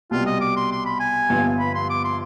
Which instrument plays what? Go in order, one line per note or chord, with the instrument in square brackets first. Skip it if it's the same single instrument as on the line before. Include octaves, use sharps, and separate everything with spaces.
[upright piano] C2 B2 G3 [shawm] F4
[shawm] D#5
D6
C6
C6
B5
G#5
[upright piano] G1 G2 F3 B3 F4
[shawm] B5
C6
D6
C6